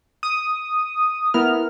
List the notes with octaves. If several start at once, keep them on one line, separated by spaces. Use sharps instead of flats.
D#6
B3 E4 A#4 F6